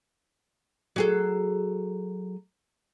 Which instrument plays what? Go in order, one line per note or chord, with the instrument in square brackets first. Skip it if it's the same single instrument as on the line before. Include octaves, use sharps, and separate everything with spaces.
[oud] F#3 G#4 A4